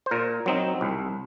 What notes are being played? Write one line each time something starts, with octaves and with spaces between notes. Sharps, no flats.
C5
A#2 A#4
F#3 C4 D#4
C2